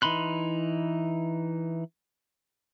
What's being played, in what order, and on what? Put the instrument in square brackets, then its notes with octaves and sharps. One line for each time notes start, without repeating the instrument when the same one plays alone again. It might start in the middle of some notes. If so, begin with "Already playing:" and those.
[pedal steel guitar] E3 D#4 B5 C6 F#6